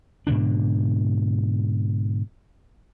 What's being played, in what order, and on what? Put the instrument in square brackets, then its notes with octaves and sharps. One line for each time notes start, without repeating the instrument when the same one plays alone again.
[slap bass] G#2 B2 D3 D4